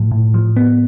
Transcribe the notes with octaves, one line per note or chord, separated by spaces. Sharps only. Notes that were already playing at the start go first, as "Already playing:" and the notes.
Already playing: A2 F3
A2
F3
B3